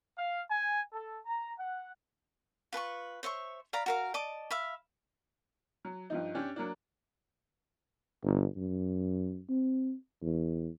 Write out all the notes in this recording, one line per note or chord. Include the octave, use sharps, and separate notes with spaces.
F5
G#5
A4
A#5
F#5
F4 B4 A5 C#6
C5 C#5 E5 C#6
D5 F5 A#5 B5
F#4 A#4 F5
D5 D#5 A5 D6
E5 F5 B5
F#3
G2 F3 D#4
C#4 D4 G4
F#3 A#3 D4
G1
F#2
C4
E2